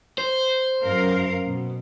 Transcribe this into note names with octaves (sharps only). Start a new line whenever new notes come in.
C5
F#2 A#4 F5
B2